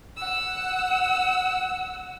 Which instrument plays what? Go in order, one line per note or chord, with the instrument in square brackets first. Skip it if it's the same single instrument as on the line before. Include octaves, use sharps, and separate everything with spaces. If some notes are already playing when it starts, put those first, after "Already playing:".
[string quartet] F#5 E6